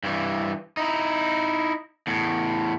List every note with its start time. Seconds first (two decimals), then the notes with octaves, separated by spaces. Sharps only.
0.04 G2 E3
0.77 D#4 E4
2.07 E2 A2